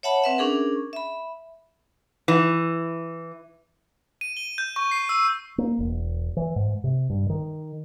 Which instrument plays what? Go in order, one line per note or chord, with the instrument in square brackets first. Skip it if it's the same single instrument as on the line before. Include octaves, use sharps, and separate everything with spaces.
[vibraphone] C#5 E5 F#5 A5 B5
C4 B4 E5 F#5
C#4 D4 G#4 A#4
E5 B5
[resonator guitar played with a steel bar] E3
[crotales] D#7
G7
G6
C#6
C7
E6
[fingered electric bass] A#3
E1
E3
G#2
C3
G2
D#3